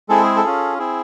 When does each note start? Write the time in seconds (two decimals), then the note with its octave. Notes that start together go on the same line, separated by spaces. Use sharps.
0.09 G#3 C4 E4 G#4 A4
0.23 G#4
0.36 A4
0.44 C#4 F4 G#4
0.78 C4 E4 G#4